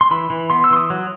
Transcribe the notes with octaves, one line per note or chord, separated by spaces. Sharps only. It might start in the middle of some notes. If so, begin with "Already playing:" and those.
C6
E3 B5
E3
B3 C6
E6
E3 C6
D#6
F#3